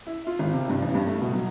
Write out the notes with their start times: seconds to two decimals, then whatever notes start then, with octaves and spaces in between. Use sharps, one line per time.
0.07 E4
0.27 F4
0.39 G#1
0.54 C3
0.69 G2
0.82 A1
0.95 G2
1.06 A3
1.21 B2
1.33 F#3